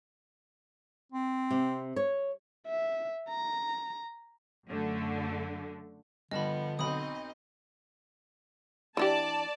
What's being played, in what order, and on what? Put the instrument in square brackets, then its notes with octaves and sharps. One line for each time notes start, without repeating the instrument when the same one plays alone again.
[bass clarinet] C4
[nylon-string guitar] C3
C#5
[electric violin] E5
A#5
[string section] F#2 D3 A3
[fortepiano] G2 [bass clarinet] D3 [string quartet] F3 B3 [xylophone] D#5 A5 B5
[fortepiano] B1 [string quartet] C4 D#4 D#5 [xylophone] B5 D#6
[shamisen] E3 D4 G4 [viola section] D5 A5